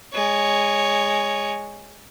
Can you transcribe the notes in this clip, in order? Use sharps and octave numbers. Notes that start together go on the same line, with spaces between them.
G#3 C#5